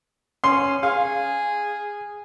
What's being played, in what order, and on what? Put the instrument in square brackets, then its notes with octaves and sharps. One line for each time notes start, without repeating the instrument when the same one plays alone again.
[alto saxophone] C#4 [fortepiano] C6
[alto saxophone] G#4 [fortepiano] F5